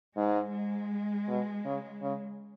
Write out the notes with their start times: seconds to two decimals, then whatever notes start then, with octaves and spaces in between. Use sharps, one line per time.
0.17 G#2 G#3
0.54 G#3
1.28 B2
1.65 C#3
2.02 C#3